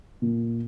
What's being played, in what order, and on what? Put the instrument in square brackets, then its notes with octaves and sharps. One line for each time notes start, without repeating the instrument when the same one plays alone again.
[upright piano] A#2